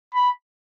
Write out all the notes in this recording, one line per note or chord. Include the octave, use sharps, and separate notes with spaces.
B5